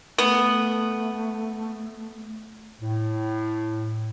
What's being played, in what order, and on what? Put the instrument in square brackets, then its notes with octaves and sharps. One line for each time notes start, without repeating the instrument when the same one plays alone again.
[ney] A3 [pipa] B3
[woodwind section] A2